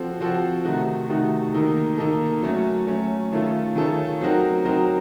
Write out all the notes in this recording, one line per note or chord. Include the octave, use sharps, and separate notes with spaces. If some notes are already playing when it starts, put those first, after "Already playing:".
Already playing: F3 C4 F#4 A4
F3 C4 F#4 A4
C3 D#3 A3 D#4 F#4
C3 D#3 A3 D#4 F#4
D#3 A#3 D#4 A4
D#3 A#3 D#4 A4
F#3 A3 C#4
F#3 A3 C#4
D#3 A3 C#4 F4 A4
D#3 A3 C#4 F4 A4
F#3 C4 D#4 F#4 A#4
F#3 C4 D#4 F#4 A#4